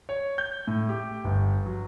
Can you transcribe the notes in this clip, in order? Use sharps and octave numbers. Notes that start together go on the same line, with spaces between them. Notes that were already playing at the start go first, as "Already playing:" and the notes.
C#5
G6
A2
G4
G1
F#3